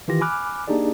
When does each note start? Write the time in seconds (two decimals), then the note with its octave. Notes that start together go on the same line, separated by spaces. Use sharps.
0.08 D#3 E3 F4 G4 A#6
0.21 G#5 B5 D6 F6 F#6
0.68 A#3 D4 D#4 G4 G#4 D5